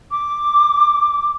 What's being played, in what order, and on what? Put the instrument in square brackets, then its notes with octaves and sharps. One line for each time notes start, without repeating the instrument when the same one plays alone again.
[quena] D6